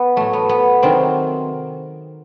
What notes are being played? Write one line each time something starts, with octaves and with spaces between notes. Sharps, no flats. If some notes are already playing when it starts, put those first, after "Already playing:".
Already playing: B3
A2 F#3 A3
B3
B3
C3 D#3 F#3 C4